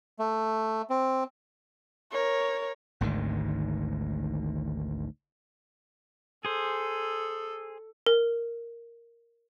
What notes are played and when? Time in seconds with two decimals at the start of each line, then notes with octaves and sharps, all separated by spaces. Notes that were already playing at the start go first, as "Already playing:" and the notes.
0.19 A3
0.90 C4
2.12 A#4 C#5
3.01 G#1 D2 G#2 D#3
6.45 G#4 A4 C5
8.06 A#4